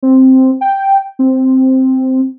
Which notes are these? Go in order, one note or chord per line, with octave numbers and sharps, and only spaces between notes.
C4
G5
C4